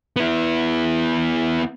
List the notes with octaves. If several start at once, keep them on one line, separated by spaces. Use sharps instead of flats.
B3 E4